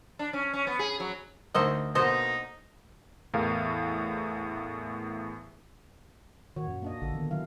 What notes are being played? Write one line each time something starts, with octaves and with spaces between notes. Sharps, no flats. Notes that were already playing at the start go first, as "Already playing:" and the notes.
D4
C#4
C#4
B3
G#4
F#3
D2 D#4 A#4 C5 D#5 E6
B2 D3 A#3 D#4 C5 D#5
E2 A2 G#4 A#4 F5
A#2 D#3 F#4 C#5
F#2
A#3 D4 D#5
A1 D3 A4
D#3 B3
F#3 E4 F5